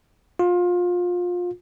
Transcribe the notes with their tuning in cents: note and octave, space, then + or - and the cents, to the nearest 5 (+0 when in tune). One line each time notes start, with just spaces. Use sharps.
F4 +25